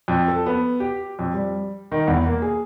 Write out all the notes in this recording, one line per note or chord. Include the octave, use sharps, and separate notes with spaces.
F2
A4
B3
G4
F2
G3
D#3
E2
A#3
G#4